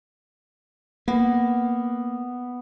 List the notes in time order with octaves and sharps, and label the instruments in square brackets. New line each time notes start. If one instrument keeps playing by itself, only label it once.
[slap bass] A#3 [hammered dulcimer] B3